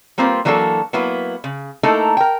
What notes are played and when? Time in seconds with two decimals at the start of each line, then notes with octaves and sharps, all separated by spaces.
0.18 G3 A#3 C4 F4 B4
0.45 E3 F#3 A#3 D4 F#4 A4
0.93 F#3 A#3 B3 E4 B4
1.44 C#3
1.83 A3 A#3 D#4 E4 A4 A#4
2.17 A#4 G5